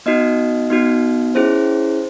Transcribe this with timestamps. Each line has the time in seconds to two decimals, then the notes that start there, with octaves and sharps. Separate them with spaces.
0.06 B3 D#4 F#4 D#5
0.70 B3 D#4 F#4
1.35 C#4 E4 G#4 C5